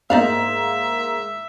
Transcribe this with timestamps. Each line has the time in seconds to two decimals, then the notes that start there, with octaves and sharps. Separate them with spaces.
0.10 G#2 A#3 D#4 D5 E5 F5